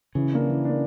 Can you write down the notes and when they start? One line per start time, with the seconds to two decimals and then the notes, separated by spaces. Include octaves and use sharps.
0.15 C#3 E3
0.32 A#3 D4
0.48 E3
0.65 A#3 D4